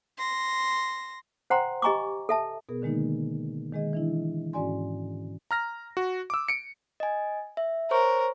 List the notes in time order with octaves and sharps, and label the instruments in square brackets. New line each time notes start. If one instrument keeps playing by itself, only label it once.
[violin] C6 A#6
[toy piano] C5 F#5 G5 A#5 C6
G4 D#5 G#5 A#5 C#6 D6
A4 E5 A5
[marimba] B2 B3 G#4 A#4
D3 D#3 G#3 A#3 D#4
D#3 G#3 G#4 D#5
E3 D4 E4
G#2 C#4 F#4 D5 G#5 C6
[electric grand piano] A#5 F6 A#6
F#4
D6 E6
C#7 D7
[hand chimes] D#5 G#5
E5
[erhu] A#4 [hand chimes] C5 C#5 C#6